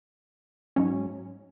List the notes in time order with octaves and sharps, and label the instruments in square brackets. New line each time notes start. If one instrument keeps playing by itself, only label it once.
[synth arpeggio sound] G#2 F#3 C#4